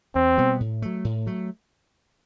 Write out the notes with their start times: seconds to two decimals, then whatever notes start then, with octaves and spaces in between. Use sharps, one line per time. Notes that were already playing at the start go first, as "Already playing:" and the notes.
0.15 E2 C4
0.38 B2 G3 B3
0.60 A2
0.82 F#3 A3
1.04 A2
1.27 F#3 A3